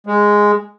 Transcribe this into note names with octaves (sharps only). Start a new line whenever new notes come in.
G#3